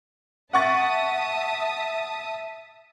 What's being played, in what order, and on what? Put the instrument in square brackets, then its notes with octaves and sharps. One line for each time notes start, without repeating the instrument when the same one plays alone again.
[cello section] E5 [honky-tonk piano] F#5 C#6 A6 [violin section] A5 D#6